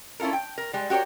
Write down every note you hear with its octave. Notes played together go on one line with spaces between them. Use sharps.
C#4 E4 F4 A4 A#4
G5
A#4
G3 G#3
F#4 G4 A#4 C#5 D5